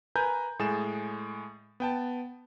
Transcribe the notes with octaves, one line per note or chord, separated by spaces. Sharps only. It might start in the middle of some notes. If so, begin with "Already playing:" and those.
A#4 B4 G#5 A#5 G6
A2 G#3 G#4 A6 E7
B3 G5 A5